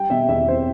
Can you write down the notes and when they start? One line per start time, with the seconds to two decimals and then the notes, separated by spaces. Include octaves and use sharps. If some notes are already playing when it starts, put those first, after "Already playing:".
Already playing: G3 G5
0.10 B2 E5
0.29 E2 E5
0.48 C4 C5